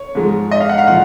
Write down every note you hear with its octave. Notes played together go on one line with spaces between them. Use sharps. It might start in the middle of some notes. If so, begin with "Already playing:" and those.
Already playing: C#5
G#2 F3 G#3
D#5
F5
F#5
F5
A#2 F3 F#5